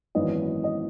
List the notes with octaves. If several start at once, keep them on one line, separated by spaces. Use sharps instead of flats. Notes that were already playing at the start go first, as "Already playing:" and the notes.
G#1 F#2 E3 B3 D#5
D#5